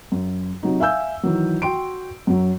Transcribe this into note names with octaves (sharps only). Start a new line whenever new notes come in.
F#2
C3 F#3 D#4
E5 F5 G#5 E6 G6
D#3 E3 F#3
F#4 G5 C6 D7
F#2 F#3